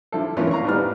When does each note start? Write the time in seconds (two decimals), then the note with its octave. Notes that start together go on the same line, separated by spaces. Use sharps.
0.12 D3 F3 E4 A4
0.37 E3 F3 A3 A#3 C#4 E4
0.51 F5 A#5 C#6
0.64 A1 G#2 G3 B3 F6